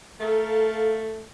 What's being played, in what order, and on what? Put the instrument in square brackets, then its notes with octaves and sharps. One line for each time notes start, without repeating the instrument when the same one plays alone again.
[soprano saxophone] A3 [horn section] A4 A#4 F5